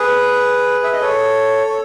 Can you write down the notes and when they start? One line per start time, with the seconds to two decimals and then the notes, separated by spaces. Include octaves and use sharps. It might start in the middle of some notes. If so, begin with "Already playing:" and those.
Already playing: G#4 B4
0.84 E5
0.93 D#5
1.00 A4 C#5
1.67 C#5